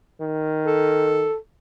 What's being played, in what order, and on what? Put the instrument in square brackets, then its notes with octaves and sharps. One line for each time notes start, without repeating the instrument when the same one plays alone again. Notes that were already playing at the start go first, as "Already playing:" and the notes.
[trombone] D#3
[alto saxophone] A4